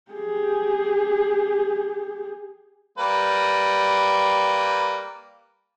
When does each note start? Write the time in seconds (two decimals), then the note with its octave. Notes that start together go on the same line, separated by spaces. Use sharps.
0.11 G4 G#4
2.98 G3 A#3 B4